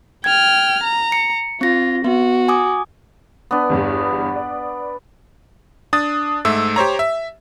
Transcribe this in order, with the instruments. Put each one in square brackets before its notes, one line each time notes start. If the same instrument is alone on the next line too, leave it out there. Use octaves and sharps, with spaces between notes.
[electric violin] G5 F6 [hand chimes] G#6
[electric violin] A#5
[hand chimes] C#7
[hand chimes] C4 A#6 [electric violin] F4
[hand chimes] B3 [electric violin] F#4
[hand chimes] G#5 D6 D#6
[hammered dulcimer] B3 D4
[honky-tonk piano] G1 E2 G2
D5
[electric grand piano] D4 D#6 A6
G#2 A3 E5 E6
G4 C5 C#5 A#5
E5